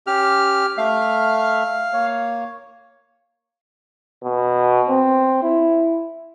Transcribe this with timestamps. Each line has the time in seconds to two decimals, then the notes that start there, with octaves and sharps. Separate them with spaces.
0.07 C#4 G4 F6
0.77 A3 E5 F5 F6
1.93 A#3 C#5
4.24 B2
4.89 C4
5.43 E4